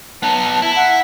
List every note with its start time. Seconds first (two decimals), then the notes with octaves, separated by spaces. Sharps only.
0.23 B3 D#4 A5
0.45 A5
0.62 E4
0.76 F#5